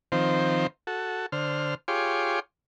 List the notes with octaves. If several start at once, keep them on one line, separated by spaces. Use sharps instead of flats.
D#3 F3 C4 C5
F#4 A4
D3 C5 F6
F4 G4 G#4 C#5 C6 D6